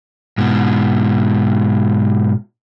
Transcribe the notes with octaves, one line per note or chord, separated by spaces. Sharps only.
G#2 B2